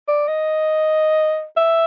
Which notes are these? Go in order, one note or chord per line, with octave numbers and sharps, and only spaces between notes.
D5
D#5
E5